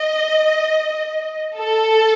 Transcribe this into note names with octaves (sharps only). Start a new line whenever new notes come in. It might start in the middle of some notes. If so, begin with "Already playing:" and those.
Already playing: D#5
A4